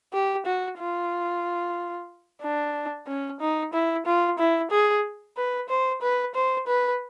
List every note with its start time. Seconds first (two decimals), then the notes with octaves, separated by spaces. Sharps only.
0.13 G4
0.45 F#4
0.79 F4
2.42 D4
3.07 C#4
3.40 D#4
3.73 E4
4.06 F4
4.38 E4
4.71 G#4
5.37 B4
5.69 C5
6.02 B4
6.34 C5
6.67 B4